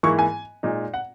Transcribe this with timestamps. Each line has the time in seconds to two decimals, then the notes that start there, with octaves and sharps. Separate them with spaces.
0.03 G#2 E3 A#3 E4 C#6
0.19 G#5
0.63 A#2 G#3 D#4
0.94 F#5